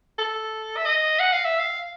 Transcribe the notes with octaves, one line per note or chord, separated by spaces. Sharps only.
A4
E5
D#5
F#5
F5
E5
F5